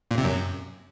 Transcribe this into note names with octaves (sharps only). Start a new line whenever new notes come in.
A#2
C3
F#2